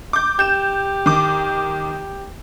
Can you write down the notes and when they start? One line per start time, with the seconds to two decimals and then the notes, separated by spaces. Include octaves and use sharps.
0.13 D6 G6
0.39 G4 G6 E7
1.06 D#3 D6